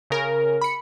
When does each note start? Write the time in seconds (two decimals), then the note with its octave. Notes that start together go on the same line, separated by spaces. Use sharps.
0.10 C#3 A#4 G#5
0.61 B5 C#7